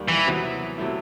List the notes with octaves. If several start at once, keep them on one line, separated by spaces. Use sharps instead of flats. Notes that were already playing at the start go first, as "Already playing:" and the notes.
Already playing: D#2 D#3 G3
E3
C3 F#3 B3 E4
C3 F#3 A3 E4